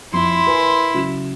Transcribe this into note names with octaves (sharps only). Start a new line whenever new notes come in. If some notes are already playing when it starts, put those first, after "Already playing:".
F2 E4 C6
A#4 B4 G#5
C#3 F#3 E7